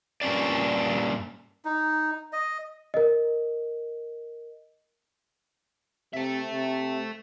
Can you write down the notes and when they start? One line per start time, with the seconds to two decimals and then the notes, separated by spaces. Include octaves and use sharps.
0.21 G2 A#2 C#4 D4 D5
1.65 D#4
2.33 D#5
2.94 A#4 D#5
6.14 C3 A4 E5
6.51 C3